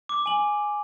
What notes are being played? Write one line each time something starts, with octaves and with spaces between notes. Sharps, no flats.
D6
G#5 F#7